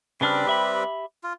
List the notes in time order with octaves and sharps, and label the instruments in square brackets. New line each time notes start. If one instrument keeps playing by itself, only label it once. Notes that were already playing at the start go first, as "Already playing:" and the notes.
[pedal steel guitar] C#3 D4 F6 [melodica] G3 C4 B4
[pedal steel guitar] G4 E5 B5
[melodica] F4